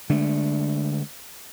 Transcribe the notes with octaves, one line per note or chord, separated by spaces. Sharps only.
D3 G#3 A3 D4